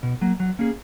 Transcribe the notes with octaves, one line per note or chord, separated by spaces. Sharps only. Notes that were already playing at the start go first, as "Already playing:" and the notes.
B2
F#3 A#3
F#3
A#3 C#4 G#4